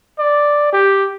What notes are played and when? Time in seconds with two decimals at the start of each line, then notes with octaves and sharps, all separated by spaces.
0.19 D5
0.73 G4